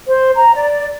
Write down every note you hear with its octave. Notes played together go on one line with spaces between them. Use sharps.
C5
A#5
D5